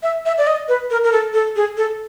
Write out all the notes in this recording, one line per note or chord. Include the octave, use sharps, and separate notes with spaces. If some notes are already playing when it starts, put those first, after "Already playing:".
E5
E5
D5
D#5
B4
A#4
A#4
A4
A4
G#4
A4